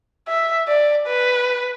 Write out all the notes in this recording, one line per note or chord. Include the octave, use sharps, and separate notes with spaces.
E5
D5
B4